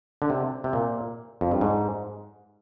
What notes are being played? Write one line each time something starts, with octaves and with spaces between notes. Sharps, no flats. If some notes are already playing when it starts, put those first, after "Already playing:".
D3
C3
C3
A#2
F2
G2
G#2